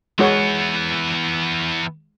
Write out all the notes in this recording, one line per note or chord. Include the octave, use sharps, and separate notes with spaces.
E3 G#3 B3 F#4 C#5